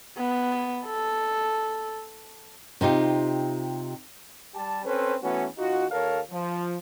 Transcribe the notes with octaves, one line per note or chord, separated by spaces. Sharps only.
B3
A4
C3 D#4 F4 G4
G3 G4 A5
C4 C#4 A4 B4 C5
E3 A3 B3 C#4 F#4
D#2 D#4 F4 F#4
D#2 A4 A#4 C#5 F5
F3